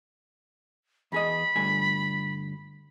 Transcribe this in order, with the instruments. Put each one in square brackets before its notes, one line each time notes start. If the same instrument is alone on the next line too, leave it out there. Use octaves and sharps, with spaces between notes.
[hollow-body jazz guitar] E2 G#4 D#5 [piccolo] B5
[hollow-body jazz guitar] D2 G2 G#5